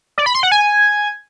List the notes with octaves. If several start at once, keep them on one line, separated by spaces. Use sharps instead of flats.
D5
B5
C6
F#5
G#5